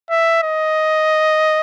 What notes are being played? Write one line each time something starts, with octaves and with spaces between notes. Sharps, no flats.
E5
D#5